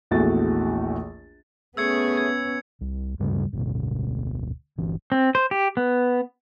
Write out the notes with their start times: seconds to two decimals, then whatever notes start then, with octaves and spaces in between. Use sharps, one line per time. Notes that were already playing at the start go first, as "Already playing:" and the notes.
0.11 A#1 E2 E3 A3 F#4 A6
1.77 A3 B3 C#4 G#4 E6 G#6 C#7
2.17 G#6
2.81 C2
3.19 D2 G2 C#3 G3
3.53 D1 G1 D2 B2
4.78 G1 E3
5.12 C4
5.35 C5
5.51 G4
5.77 B3